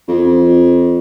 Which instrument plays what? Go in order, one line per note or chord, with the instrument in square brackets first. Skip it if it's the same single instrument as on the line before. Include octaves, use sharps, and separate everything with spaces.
[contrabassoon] F2